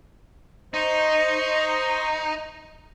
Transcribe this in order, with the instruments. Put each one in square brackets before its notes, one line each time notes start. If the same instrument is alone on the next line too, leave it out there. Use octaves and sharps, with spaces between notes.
[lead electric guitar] D#4 [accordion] C5 D#5 C#6